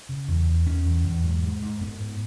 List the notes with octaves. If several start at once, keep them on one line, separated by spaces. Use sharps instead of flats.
C#3
E2
E2
E2 C#4
E2
E2
G#2
G#2
G#2
G#2 B3
G#2